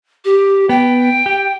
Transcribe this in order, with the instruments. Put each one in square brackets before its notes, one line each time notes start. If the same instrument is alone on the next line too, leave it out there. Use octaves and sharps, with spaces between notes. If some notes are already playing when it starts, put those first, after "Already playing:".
[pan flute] G4
[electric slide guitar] B3 [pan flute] G5
[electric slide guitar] G4